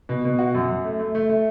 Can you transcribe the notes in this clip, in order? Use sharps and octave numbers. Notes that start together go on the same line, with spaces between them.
B2
B2
F#4
F#2
F#2
A3
A3
A3
A3